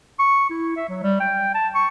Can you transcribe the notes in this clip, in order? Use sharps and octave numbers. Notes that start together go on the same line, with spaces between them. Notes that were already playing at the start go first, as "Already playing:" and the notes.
C#6
E4
E5
F#3
G3
G5
A5
C#6